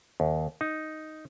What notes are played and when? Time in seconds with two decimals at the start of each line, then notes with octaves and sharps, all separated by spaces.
0.20 D#2
0.61 D#4